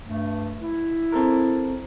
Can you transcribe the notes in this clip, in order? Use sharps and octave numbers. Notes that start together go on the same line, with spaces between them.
G2 A3
E4
C4 A4 A#4